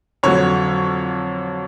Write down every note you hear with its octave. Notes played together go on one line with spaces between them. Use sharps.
F2 D3 F#3 C#5